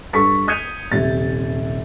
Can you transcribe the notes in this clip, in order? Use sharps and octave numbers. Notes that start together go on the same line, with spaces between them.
G2 A4 C#6 A6 B6
D#6 G6 G#6 C#7 D#7 F7
D#1 C3 A6